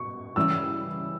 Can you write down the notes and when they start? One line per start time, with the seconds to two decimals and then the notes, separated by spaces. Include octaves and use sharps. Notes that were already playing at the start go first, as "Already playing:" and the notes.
Already playing: B2 C#6
0.36 C#3 E3 G3 C#4 E4 E6